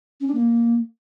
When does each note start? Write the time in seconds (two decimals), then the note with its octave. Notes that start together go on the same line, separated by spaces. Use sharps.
0.20 C#4
0.27 D4
0.34 A#3